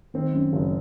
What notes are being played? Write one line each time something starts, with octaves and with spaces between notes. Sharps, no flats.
D#3 C4
F#2
F#1